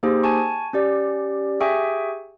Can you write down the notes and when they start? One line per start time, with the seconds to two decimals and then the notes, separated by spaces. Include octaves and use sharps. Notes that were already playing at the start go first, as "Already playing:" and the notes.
0.03 A#3 D#4 G4 G#4 C5
0.23 G#5 A5 C#6
0.73 C#4 G4 D5
1.60 G4 G#4 E5 G5 G#5 C#6